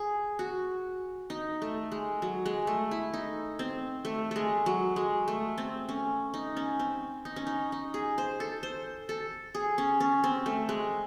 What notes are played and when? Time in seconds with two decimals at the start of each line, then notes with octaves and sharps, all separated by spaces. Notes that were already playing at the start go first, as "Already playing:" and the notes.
Already playing: G#4
0.39 F#4
1.30 D#4
1.62 A3
1.92 G#3
2.22 F#3
2.46 G#3
2.67 A3
2.91 E4
3.14 D#4
3.59 C4
4.05 A3
4.31 G#3 A3
4.66 F#3
4.96 G#3
5.28 A3
5.58 C4
5.89 C#4
6.34 D#4
6.57 C#4
6.79 C4
7.25 D#4
7.36 C#4
7.47 D#4
7.72 D#4
7.94 G#4
8.18 C5
8.40 A4
8.63 C5
9.09 A4
9.55 G#4
9.78 C#4
10.00 C#4
10.24 C4
10.46 A3
10.69 G#3